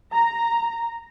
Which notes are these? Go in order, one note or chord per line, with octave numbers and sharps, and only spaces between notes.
A#5